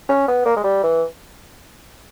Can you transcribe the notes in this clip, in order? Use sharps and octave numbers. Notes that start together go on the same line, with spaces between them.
C#4
B3
A#3
G#3
G3
E3